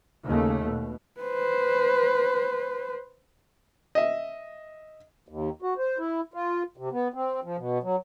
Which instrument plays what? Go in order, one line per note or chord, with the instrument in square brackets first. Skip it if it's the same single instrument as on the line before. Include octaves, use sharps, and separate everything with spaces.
[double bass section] D#2 C#3 A3
B2
[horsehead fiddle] B4 C5
[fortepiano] D#5 E5
[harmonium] D#2
F#4
C5
E4
F4
C3
B3
C4
F3
B2
F#3